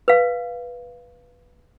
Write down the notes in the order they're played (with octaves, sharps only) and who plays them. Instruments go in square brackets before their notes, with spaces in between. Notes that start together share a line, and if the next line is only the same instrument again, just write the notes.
[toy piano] B4 F5